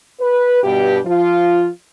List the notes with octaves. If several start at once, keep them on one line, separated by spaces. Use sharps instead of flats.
B4
G2 B2 G4
F3 F4